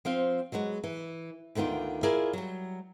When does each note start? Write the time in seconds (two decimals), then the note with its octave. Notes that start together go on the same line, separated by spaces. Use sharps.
0.05 F3 C4 F5
0.52 F#3 G#3 B3 F#4
0.84 E3
1.55 D2 D3 D#3 B3 F4
2.03 E4 F4 G#4 A#4 D5
2.33 F#3 G3